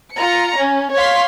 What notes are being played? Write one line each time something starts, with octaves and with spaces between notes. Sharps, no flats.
F4 A#5 C#7
C#4
C#5 F5 C6 B6